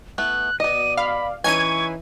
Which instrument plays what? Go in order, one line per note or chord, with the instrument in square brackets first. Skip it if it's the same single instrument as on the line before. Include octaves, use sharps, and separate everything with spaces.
[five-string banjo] A3 B3 E4 [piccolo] F#6
[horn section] B2 D5 [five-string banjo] B3 D#5 [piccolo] D#7
[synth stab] F5 [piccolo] B5
[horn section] E3 [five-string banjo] C#4 D#4 G#5 [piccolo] C#6 [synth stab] G#6 D#7